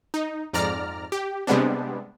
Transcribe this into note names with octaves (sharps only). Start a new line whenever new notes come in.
D#4
F2 G#2 D5 A#5 F6
G4
C3 G3 G#3 B3 C4 D4